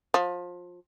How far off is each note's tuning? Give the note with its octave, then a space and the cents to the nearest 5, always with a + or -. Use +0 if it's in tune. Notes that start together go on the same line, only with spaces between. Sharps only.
F3 +25